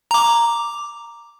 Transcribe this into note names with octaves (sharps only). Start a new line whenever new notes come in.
A#5 D6